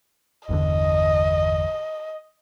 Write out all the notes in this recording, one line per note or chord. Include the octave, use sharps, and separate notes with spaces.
G1 E2 D3 D#5